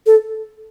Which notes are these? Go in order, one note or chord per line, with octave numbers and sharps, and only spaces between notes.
A4